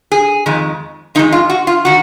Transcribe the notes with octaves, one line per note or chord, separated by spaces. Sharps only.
G#4
F2 D#3 G#3
F2 D#3 G#3 D#4
F4
F#4
F4
D#3 F#4